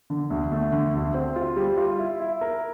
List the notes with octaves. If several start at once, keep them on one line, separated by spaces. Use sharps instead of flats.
D3
D2
A3
D3
D2
C4
F4
G3
F4
E4
E4
A#4